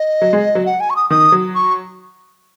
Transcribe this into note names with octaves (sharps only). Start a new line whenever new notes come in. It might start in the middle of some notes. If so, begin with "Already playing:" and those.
Already playing: D#5
F#3
G#3
F#3
F#5
G#5
C#6
D#6
D#3 D#6
F#3
C#6